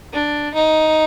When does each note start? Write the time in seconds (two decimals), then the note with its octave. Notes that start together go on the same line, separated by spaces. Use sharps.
0.13 D4
0.54 D#4